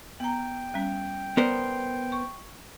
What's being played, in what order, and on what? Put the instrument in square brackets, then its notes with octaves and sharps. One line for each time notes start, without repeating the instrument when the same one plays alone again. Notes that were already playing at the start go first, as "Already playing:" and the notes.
[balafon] B3 A#5 [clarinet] G5
[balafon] G3 C#4
[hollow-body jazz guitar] B3 A#4 C5 [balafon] D5
[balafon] C#6